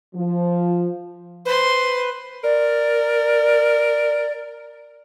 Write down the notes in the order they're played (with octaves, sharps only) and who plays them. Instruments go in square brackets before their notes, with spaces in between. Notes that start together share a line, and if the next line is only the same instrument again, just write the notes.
[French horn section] F3
[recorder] B4 [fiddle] C5 C6
[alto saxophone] A#4 [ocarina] D5